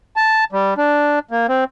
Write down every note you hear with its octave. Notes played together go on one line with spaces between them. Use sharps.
A5
G3
D4
A#3
C4